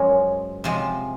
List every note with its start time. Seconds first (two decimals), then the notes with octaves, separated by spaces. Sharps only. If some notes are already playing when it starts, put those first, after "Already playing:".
Already playing: F#2 F3 G#3 A#4 C#5
0.64 C3 F3 G#3